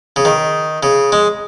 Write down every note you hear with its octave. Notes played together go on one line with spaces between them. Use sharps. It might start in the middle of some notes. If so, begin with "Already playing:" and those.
C#3
D#3
C#3
G#3